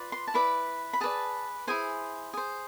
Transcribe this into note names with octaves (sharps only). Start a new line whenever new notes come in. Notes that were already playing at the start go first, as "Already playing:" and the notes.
Already playing: F4 B4 D5
C6
A5
E4 B4 D5 B5
B5
G#4 B4 D5 A5
E4 G#4 C5 G#5
G#4 C5